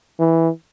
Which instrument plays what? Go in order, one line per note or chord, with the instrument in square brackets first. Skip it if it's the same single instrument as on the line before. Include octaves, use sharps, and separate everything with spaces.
[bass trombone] E3